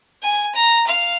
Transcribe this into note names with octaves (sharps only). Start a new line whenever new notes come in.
G#5
A#5
F5